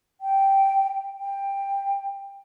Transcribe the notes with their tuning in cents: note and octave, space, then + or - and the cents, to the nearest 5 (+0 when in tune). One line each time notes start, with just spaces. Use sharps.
G5 -5
G5 +15